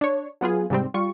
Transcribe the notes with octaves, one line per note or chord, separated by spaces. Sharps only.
D4 C#5
F#3 B3 F4 G#4
G#2 C3 G3 C4
G3 F4 C#6